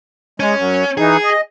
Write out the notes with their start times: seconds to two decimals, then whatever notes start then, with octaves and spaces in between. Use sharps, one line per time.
0.40 G#3 C#4
0.57 F#2
0.98 E3 D#4 G#4
1.24 D#5